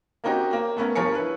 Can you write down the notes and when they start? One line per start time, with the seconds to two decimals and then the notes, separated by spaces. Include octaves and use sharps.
0.24 A#3 C4 C#4 D#4 F#4 G4
0.53 A#3
0.77 A3 B3 C#4 A#4
0.95 G2 F3 A#4 C#5 G#5 C#7
1.15 E4 B4